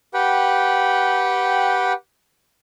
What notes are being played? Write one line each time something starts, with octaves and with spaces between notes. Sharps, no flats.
G4 B4 F#5 G5